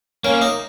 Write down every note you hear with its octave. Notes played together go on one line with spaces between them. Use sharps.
A#3 C#4
D#4